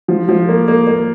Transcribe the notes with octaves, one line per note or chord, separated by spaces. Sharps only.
F3
F3
A#3
A#3
A#3